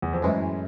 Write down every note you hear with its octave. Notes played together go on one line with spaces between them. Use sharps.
E2
F2
F#2 A2 E3 G#3